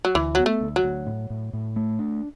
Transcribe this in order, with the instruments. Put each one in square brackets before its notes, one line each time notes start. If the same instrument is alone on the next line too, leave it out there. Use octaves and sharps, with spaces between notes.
[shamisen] F#3
[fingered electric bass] D2 [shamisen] E3
[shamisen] F#3 [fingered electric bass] B3
[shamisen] A3
[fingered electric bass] D2
[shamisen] F#3
[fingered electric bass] D2
A2
A2
A2
A3
D4